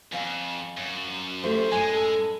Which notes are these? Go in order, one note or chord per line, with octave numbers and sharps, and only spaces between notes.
F2 D5 F5 G#5
F#2
D5
A3 F4 G4 C5
F#2 A2 G#3 G#5 A5
A4